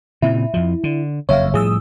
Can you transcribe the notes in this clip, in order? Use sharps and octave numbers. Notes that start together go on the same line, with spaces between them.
A#2 C#3 C4 E4
F2 F3
D3
F#1 F2 C#5 E5 F5
A2 F3 G3 G#4 D#6 E6